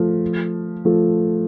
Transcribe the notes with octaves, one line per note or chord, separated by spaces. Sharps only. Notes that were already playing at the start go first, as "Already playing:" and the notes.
Already playing: F3 A3
F3 A3